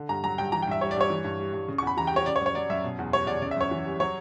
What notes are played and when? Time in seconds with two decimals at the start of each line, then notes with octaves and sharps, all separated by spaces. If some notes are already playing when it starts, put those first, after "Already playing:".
Already playing: D3
0.09 G2 A#5
0.24 F#3 A#5
0.38 G2 G5
0.52 E3 A#5
0.62 G5
0.67 G2 E5
0.81 G3 C#5
0.91 D5
0.96 G2 C#5
1.10 E3
1.24 G2
1.39 G3
1.53 G2
1.68 C#3
1.78 C#6
1.82 E2 B5
1.97 E3 A#5
2.07 G5
2.11 G3 C#5
2.26 C#3 D5
2.36 C#5
2.41 F#2
2.46 C#5
2.55 F#3 D5
2.70 F#2 E5
2.84 B2
2.99 E2
3.12 G3 C#5
3.27 E2 D5
3.42 C#3 D5
3.51 E5
3.57 F#2 C#5
3.71 E3
3.86 G3
3.99 F#3 C#5